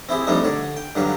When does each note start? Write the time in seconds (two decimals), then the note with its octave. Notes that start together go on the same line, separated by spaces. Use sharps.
0.09 C4 E4 G4 G#4
0.27 F3 G3 A3 C4 D4 D#4
0.44 D3 C#5 D5
0.77 G5
0.95 G2 D3 F#3 G4 F5